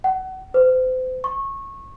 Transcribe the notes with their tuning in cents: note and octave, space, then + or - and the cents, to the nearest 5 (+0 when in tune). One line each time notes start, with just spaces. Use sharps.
F#5 +30
C5 -35
C#6 -20